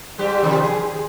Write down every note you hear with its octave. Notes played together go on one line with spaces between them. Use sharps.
G#2 G3 G4
C3 D#3 F3
G#4